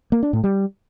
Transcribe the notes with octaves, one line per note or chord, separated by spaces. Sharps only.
A#3
D4
A2
G3